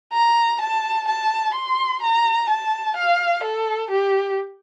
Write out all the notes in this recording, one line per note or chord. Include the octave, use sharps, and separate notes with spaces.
A#5
A5
A5
C6
A#5
A5
F5
A4
G4